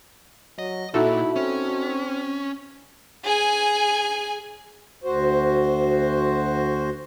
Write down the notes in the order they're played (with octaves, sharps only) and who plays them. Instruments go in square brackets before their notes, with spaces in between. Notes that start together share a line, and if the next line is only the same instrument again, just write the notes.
[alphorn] F#3 [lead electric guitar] D#5
[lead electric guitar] A#2 [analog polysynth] D#4 F#4 A4 [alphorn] E4
[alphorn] C4 [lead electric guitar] C#4
[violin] G#4 G#5
[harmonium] D2 F#4 C5